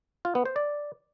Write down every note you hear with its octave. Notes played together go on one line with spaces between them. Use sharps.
F4
B3
C5
D5